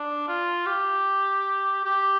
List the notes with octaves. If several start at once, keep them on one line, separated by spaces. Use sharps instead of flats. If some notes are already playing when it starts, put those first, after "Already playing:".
Already playing: D4
F4
G4
G4